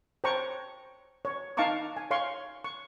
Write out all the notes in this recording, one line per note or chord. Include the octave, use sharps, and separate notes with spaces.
C5 C#5 G5 A5 A#5 C#6
C#5
D#4 F5 A5 A#5 C#6 D6
G#5
C#5 F5 C6 C#6
C#6